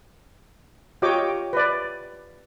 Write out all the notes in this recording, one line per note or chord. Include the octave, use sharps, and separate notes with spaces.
F4 G4 C#5 D#5 G5 D6
B4 D5